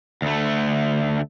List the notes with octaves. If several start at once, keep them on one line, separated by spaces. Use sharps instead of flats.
D2 A3